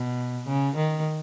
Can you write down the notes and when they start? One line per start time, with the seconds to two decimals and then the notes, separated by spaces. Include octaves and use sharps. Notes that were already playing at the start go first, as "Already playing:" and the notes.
Already playing: B2
0.48 C#3
0.76 D#3